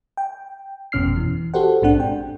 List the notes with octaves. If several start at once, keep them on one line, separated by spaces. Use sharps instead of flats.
G5
G1 F2 B2 C#4 F6 C7
E3
F#4 G4 A4 C5 F#5
A#1 G#2 G#3 C4 D4 F#5
G5